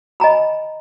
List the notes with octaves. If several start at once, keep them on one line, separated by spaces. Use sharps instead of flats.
D#5 G#5 A#5 B5